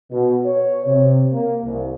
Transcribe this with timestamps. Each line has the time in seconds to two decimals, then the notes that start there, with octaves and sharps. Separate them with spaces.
0.11 B2
0.45 C#5
0.85 C3
1.32 A#3
1.64 C2